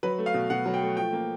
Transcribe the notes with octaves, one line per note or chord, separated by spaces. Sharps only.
F#3 B4
A3
F5
B2
B2 F#5
F#3
G5
A3
F3 G5
A#3